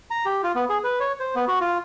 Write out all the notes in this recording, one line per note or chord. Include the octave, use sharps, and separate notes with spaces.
A#5
G4
F4
B3
G#4
B4
C#5
C5
B3
F#4
F4